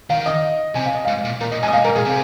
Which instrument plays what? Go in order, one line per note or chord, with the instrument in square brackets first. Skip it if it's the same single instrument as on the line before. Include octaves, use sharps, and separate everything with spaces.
[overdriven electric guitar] D#3 [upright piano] F5
[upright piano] D#5
[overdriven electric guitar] C3 [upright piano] G#5
[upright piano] F5
D#5
[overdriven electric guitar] G#2 [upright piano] F5
[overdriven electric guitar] A#2
[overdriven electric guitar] A#2 [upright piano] A#4
[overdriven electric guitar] A#2 [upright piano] D#5
[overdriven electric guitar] G#2 [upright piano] G#5
[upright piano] D#5
[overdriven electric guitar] A#2 [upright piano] F5
[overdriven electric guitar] G#2 [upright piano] A#4
[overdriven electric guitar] A#2 [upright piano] G#4
[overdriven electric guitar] C3